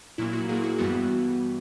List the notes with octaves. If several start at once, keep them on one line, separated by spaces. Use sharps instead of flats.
A#2 F#3 A#3 E4
F#4
A#2 F#3 A#3 G#4
F#4
G2 E3 G3 B3 F#4